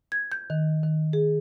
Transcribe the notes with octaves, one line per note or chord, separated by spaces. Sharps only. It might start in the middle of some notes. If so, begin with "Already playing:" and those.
G#6
G6
D#3
D#3
G#4